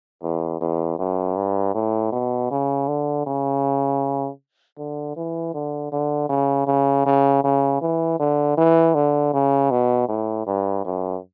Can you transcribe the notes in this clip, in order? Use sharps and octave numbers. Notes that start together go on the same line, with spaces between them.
E2
E2
F#2
G2
A2
B2
C#3
D3
C#3
D3
E3
D3
D3
C#3
C#3
C#3
C#3
E3
D3
E3
D3
C#3
B2
A2
G2
F#2